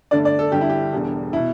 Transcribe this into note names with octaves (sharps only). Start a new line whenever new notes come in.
G1 G2 D3 A3 D5
D5
A4
G1 G2 G3 G4
E4
G4
E1 E2 D3 G3
B2 E4